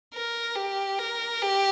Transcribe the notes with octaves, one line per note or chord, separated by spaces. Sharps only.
A#4
G4
A#4
G4